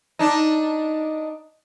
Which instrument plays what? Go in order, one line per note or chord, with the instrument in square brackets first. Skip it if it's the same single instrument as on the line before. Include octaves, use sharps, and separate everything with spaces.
[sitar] D4 D#4